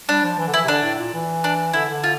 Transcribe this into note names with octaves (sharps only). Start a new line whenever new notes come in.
G3 D4
F3
E3
D3
E3 E4
C3
D3 D4
A2
A#2
E3
D4
D3 E4
D3
F4